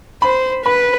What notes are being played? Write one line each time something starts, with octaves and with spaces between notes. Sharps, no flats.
C5 B5
B4 B5